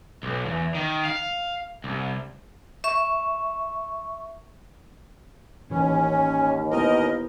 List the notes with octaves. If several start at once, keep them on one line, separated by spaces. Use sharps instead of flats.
B1
E2
D#3
F5
C2
E5 C#6
A1 D#2 E3 C#4
B3 E4 A#4 C5 D#5